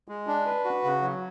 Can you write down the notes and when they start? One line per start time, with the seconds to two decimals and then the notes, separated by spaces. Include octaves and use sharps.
0.08 G#3
0.27 D4
0.46 B4
0.64 F#4
0.84 C#3
1.01 F#3